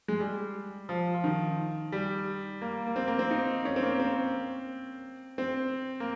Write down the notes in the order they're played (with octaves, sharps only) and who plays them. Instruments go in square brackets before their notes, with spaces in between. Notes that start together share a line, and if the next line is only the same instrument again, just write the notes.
[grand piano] G#3
G3
F3
F3
D#3
G3
A#3
A#3
C4
A#3
C4
D#4
C#4
C4
A#3
C4
C4
A#3